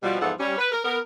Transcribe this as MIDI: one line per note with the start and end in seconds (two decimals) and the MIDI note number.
0.03 0.18 47
0.03 0.18 53
0.03 0.18 55
0.21 0.33 40
0.21 0.33 44
0.21 0.33 52
0.21 0.33 53
0.21 0.33 69
0.21 0.33 78
0.39 0.55 55
0.39 0.55 61
0.58 0.68 71
0.71 0.82 70
0.85 0.99 59
0.85 0.99 70